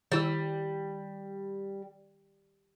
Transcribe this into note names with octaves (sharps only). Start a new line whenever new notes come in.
D#3 G3 E4 E6